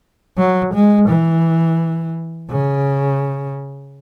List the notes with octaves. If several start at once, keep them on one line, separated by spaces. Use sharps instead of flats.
F#3
G#3
E3
C#3